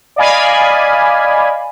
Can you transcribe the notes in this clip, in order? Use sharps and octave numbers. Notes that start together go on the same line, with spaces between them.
D5 D#5 F5 G#5 B5